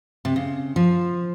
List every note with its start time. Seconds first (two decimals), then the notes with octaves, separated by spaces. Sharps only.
0.25 C3
0.36 C#3
0.76 F3